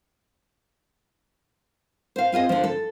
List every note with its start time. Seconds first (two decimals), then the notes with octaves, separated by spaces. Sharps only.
2.16 C5 F5
2.32 C4 F4 G#4 D#5
2.49 D3 F3
2.64 A4